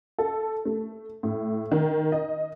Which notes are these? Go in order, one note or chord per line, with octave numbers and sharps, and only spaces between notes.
A4
A3
A2
D#3
D#5